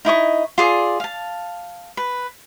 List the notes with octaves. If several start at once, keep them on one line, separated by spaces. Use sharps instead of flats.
D#4 E4 D#5 C#6
F4 G#4 D5
F5 A5
B4